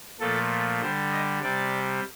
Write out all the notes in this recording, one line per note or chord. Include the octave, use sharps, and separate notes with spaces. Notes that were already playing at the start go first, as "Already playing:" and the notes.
A#2 F3 A3 A4
D3 G3 C5
D#5
C3 G3 D5